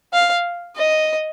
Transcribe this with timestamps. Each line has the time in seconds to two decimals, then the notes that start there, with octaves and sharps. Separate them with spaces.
0.13 F5
0.77 D#5